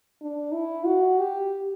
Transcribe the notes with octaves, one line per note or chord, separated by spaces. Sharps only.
D4
E4
F#4
G4